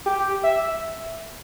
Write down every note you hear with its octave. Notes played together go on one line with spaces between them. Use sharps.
G4
E5